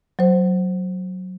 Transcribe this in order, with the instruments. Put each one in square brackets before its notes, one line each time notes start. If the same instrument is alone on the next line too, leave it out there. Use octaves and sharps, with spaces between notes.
[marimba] F#3 C5